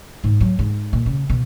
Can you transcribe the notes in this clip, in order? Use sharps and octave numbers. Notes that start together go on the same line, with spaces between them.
G#2
F#3
G#2
A#2
C#3
B2